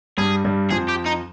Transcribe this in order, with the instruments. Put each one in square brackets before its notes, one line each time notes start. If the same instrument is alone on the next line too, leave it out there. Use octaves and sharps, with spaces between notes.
[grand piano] G2 G3 [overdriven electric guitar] G#4
[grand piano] G2 G3
[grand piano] F2 F3 [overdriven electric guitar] G#4
[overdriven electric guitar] G4
D#4